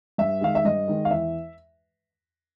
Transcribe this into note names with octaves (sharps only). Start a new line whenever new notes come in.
G2 E5
D#3 G#3 F5
E5
G2 D#5
D#3 G#3
F5
E2 E5